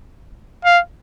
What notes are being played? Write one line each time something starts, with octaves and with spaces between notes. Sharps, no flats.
F5